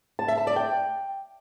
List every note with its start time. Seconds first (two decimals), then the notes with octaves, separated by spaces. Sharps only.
0.19 A5
0.28 E5
0.38 A5
0.47 D5
0.56 G5